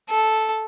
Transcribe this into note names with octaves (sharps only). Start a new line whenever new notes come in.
A4